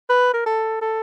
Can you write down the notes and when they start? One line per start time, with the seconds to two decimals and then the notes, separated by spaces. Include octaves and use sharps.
0.10 B4
0.34 A#4
0.46 A4
0.81 A4